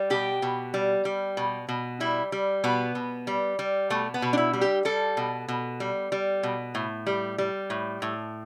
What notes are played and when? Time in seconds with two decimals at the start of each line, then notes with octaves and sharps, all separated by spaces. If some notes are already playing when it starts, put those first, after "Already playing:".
Already playing: G3
0.10 B2 G4
0.42 B2
0.74 G3
1.05 G3
1.37 B2
1.69 B2
2.00 G3 E4
2.32 G3
2.64 B2 B3
2.95 B2
3.27 G3
3.59 G3
3.90 B2 A3
4.14 B3
4.22 B2
4.33 D4
4.38 E4
4.53 G3
4.61 G4
4.85 G3 A4
5.17 B2
5.48 B2
5.80 G3
6.12 G3
6.43 B2
6.75 A2
7.07 G3
7.38 G3
7.70 A2
8.02 A2